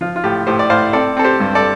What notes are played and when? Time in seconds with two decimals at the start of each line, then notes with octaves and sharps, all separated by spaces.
0.01 F3 F4
0.16 F4
0.24 A2 G4
0.47 A2 G4 C5
0.59 D5
0.70 A2 C5 F5
0.93 C4 A4 D5
1.17 C4 A4
1.24 G4 C5
1.40 G2
1.55 A4 D5